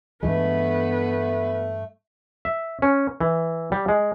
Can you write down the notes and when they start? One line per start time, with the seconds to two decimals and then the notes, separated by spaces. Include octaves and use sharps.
0.23 G2 E3 G#3 A3 B3 B4
2.45 E5
2.82 C#4
3.20 E3
3.72 G3
3.89 G#3